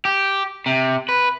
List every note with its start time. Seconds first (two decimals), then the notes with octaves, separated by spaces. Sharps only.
0.05 G4
0.66 C3
1.09 B4